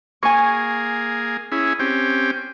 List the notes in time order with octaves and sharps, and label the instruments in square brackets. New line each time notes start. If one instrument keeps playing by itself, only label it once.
[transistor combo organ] A#3 G#4 [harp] G#5 C#6
[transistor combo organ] C#4 E4 G#4
C4 C#4 G4